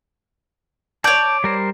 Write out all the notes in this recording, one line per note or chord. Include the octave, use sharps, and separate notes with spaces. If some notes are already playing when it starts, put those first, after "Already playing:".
C#5 D5 A5 G6
G3 A#4 C5